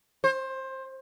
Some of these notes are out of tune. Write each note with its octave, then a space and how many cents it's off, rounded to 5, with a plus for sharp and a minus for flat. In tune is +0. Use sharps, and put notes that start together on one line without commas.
C5 +20